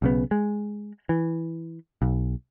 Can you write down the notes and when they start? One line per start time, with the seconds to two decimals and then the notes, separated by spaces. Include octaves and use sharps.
0.02 B1 C#3 B3
0.31 G#3
1.09 E3
2.02 B1